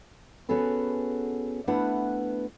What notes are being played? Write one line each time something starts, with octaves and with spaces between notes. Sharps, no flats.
B3 C#4 F#4 G#4 A4 B4
A3 B3 D4 E4 B4 F#5